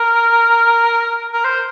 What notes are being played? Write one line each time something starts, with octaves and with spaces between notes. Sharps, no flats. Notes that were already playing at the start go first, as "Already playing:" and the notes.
Already playing: A#4
A#4
C5